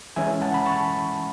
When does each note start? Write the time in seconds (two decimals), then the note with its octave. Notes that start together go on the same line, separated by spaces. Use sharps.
0.16 E3 G#3 C#4 E5 G#5
0.42 F#5 A5
0.54 B5
0.66 A5 C#6